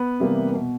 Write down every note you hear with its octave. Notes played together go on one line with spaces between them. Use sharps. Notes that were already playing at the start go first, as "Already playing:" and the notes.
Already playing: B3 B4
C3 E3 G3 A#3
B2